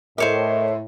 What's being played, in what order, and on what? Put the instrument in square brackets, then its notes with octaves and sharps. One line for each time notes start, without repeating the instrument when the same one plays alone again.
[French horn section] A2 [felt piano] A#4 D#5 [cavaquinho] C5 C#5 D6 [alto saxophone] E5